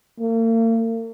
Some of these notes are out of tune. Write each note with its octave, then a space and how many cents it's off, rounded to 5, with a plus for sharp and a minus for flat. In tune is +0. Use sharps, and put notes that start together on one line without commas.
A#3 -45